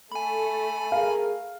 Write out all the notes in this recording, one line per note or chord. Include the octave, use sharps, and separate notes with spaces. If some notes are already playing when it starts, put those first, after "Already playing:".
A3 G#5 B5
G#4 A#4 F5